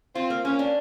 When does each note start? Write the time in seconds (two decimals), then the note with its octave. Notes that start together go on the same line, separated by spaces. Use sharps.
0.15 C4 F4
0.30 A#3
0.44 A#3 C#4
0.59 D4